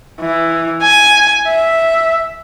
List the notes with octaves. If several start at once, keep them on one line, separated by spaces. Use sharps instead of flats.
E3
G#5
E5